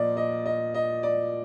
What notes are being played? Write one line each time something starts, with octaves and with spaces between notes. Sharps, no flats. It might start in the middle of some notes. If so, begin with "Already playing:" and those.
Already playing: A#2 F3 D5 D#5
D#5
D#5
D#5
D5